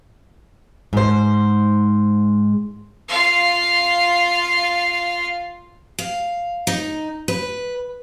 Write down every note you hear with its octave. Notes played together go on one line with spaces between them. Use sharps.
G#2 C5
F4 F5
F5
D#4
B4